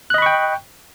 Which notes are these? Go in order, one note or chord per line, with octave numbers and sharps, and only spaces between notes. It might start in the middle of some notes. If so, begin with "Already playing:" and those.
D#5 G5 B5 C#6 F#6